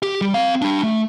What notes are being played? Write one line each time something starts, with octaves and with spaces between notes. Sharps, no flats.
G4
G3
C4 F5
G3 D4
A3